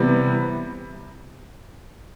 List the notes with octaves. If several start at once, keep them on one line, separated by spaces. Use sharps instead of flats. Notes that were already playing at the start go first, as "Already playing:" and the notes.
Already playing: C3 E3 G3 B3